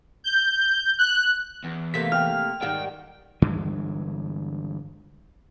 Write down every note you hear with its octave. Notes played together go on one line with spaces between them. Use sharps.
G6
F#6
E2
C3 A3 A#3 B6
G5 F6
G#2 D#3 G3 F#5 G5
G2 D3 E3 G#3